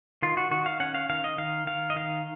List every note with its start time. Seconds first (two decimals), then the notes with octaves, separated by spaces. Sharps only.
0.22 D#3 F4
0.37 F#4
0.51 D#3 F#4
0.66 F5
0.80 C#4 F#5
0.95 F5
1.10 D#3 F5
1.24 D#5
1.38 D#3 F5
1.67 D#3 F5
1.90 D#5
1.96 D#3 F5